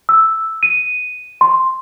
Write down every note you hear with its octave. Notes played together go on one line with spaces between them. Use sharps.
E6
D#7
C6